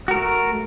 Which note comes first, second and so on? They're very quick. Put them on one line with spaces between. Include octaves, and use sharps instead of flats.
F#4 A#4 A3